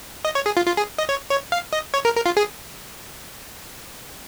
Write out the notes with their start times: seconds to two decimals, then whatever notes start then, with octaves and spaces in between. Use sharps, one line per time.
0.25 D#5
0.35 C#5
0.46 G#4
0.57 F4
0.67 F4
0.77 G#4
0.99 D#5
1.09 C#5
1.30 C#5
1.52 F5
1.73 D#5
1.94 C#5
2.05 A#4
2.16 A#4
2.26 F4
2.37 G#4